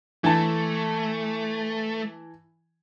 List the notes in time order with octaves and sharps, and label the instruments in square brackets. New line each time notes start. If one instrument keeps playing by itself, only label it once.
[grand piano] E3 A5 [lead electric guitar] A3